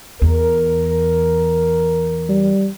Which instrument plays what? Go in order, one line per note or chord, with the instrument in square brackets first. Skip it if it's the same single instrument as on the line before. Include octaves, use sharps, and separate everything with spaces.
[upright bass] E2 [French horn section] A#4
[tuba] G3